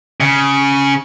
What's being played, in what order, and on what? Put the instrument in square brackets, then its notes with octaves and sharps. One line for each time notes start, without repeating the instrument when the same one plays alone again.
[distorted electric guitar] C#3